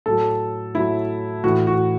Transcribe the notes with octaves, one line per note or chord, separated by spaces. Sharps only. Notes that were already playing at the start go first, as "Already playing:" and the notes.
A2 F#3 A4
A2 F#3 E4
A2 E3 F#4
F#4